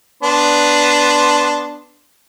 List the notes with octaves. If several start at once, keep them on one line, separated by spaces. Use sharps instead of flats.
B3 D4 C6